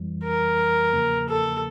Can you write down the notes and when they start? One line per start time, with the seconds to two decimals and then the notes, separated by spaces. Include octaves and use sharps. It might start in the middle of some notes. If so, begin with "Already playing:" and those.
Already playing: F2 E3 G3
0.24 A#4
0.93 E2 C#3 F3 A#3
1.28 A4